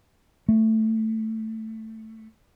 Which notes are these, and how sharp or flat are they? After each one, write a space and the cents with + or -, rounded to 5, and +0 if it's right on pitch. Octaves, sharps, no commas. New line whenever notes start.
A3 +10